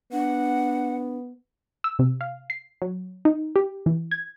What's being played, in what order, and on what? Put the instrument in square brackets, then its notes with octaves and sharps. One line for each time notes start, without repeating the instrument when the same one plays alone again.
[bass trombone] B3 [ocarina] D4 [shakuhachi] F#5
[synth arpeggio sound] E6
C3
F5
C7
F#3
D#4
G4
E3
G#6